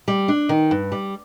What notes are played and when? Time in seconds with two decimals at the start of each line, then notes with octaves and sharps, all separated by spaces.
0.08 G3
0.28 D4
0.49 D#3
0.71 G2
0.92 G3